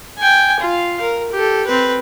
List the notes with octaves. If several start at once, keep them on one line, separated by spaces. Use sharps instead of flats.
G5 G#5
F4 F5
A#4
G4 A4
C4 B4